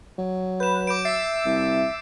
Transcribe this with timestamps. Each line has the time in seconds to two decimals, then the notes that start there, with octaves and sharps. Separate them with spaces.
0.19 F#3
0.60 B4 G6 E7
0.87 D6 G6 D7
1.05 E5 A6 C7
1.45 C2